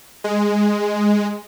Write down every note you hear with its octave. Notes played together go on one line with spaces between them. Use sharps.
G#3